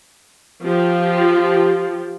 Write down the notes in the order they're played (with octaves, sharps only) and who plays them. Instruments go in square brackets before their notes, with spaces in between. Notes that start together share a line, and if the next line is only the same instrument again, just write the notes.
[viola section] F3 G4